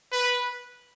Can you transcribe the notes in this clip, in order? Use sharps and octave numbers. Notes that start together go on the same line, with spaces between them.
B4